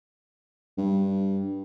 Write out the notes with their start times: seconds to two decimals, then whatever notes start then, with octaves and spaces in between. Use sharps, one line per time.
0.78 G2